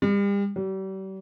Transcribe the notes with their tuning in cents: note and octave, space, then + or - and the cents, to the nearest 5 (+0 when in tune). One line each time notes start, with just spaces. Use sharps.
G3 +40
G3 -40